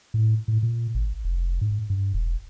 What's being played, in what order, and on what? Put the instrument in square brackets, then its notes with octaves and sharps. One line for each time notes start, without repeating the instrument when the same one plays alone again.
[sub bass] A2
A2
A#2
G#1
F1
G#2
G2
E1